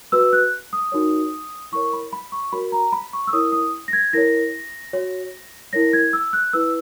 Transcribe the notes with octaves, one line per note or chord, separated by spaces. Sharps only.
F#4 B4 E6
F#6
D#6
D#4 F#4 A#4 C#5
E4 A#4 C#5 C#6
B5
B5
C#6
F#4 A#4 C#5 B5
A#5
B5
C#6
E6
E4 A#4 C#5 D#6
D#6
A#6
G#6
E4 A#4 C#5 A#6
F#4 C#5
E4 A#4 C#5 A#6
G#6
E6
F#6
E4 B4 E6